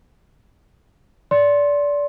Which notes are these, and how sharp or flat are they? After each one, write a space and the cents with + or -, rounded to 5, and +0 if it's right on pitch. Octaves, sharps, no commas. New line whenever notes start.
D5 -20 C6 +15